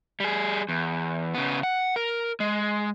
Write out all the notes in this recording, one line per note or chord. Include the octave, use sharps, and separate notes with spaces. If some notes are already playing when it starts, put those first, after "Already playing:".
G3 G#4
E2
C#3 B3
F#5
A#4
G#3